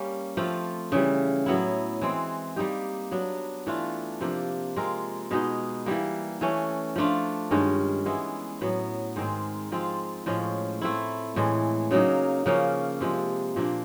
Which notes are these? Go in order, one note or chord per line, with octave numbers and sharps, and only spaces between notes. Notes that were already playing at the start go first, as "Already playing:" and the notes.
Already playing: G3 A#3 C#4
F3 A3 C4 F4
C#3 E3 G3
A2 F#3 B3 E4
E3 G#3 C4
G3 A#3 D#4 G4
F#3 B3 D4
E3 A3 D4 F4
C3 F3 A#3 D4
G#3 C4 F4 A#4
B2 G#3 B3 D#4
E3 G3 A#3
E3 A3 C#4
F3 A3 D4 F4
G2 D#3 G#3 C#4
E3 G#3 B3 E4
A2 F#3 B3
G#2 D#3 G#3 C4
F3 G#3 C4 F4
A2 F3 G#3 C#4
A3 C4 E4
A2 E3 G#3
C#3 F#3 A#3 D#4
C#3 F3 A#3 C#4
C3 F3 G#3
A#2 F3 A#3 D4